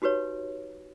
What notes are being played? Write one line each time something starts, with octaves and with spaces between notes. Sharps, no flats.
D#4 F#4 G4 B4 C#5